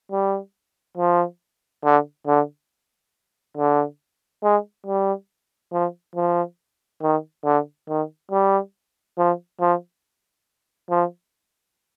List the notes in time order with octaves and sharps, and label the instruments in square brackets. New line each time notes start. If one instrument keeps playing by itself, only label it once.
[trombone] G3
F3
D3
D3
D3
G#3
G3
F3
F3
D#3
D3
D#3
G3
F3
F3
F3